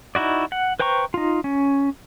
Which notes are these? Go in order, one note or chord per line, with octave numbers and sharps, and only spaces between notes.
D#4 E4 F#4 D5
F#5
B4 C5 G5 A#5 C#6
D#4 F4
C#4